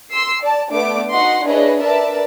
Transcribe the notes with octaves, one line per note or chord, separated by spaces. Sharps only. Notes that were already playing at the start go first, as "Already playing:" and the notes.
C6 E6 C7
D5 A5
A3 B3 D4 D6
D#4 F#4 D#5 F#5 C6
D4 E4 G#4 B4 C#5 D#5
D4 A#4 B4 D5 E5 A5